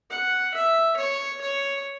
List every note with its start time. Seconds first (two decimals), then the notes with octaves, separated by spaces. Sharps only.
0.10 F#5
0.54 E5
0.97 C#5
1.41 C#5